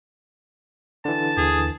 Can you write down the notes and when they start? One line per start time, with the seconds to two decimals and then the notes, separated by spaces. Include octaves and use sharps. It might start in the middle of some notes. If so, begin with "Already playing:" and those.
1.05 D3 E3 A5
1.37 D#2 G#4